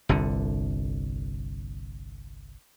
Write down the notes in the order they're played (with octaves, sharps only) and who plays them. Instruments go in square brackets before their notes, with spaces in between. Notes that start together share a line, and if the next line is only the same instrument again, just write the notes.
[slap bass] G1 C2 D3